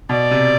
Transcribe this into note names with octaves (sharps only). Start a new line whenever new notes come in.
B2 D5
C3